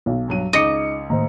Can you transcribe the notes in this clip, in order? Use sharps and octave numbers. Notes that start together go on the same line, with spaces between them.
B1
G2 F#3 D#7
C#2 D#4 D#5 D6 C#7
A2 D#3 A#3 C5 D#5 A#5